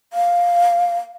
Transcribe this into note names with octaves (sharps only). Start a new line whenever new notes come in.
F5